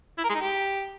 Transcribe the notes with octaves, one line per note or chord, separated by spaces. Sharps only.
E4
A#4
G#3
D#4
G4